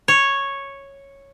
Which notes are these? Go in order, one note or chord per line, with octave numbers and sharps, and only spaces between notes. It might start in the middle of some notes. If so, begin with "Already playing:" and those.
C#5